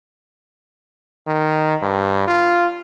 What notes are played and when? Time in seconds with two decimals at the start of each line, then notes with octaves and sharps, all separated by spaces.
1.28 D#3
1.83 G2
2.28 F4